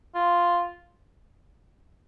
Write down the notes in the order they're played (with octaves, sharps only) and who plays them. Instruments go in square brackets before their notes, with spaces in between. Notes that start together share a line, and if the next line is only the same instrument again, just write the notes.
[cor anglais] F4